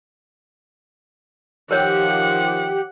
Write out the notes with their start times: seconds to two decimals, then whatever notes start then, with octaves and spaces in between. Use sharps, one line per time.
1.71 D#3 F3 G4 A#4 C5 C#5 F#5